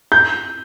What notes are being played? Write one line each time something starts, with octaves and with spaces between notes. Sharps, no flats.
G6